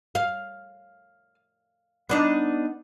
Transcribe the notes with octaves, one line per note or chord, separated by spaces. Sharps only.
F5
B3 D4 D#4